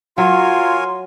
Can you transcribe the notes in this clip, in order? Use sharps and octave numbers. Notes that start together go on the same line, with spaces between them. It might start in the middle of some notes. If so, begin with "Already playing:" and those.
F#3 F4 A#4 C#5 G#5 C6